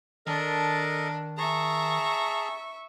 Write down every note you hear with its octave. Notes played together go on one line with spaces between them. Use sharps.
D#3 D4 A4 A#4 D#5
G#4 E5 A5 A#5 C#6